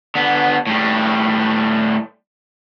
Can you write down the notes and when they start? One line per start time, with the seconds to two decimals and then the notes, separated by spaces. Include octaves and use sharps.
0.15 D3 B3
0.67 A2 G3